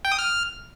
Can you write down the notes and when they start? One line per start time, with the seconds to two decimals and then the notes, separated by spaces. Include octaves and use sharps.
0.05 G5
0.12 D#6
0.19 F6